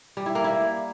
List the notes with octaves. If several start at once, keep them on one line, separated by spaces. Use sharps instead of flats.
G3
E4
A#3
E4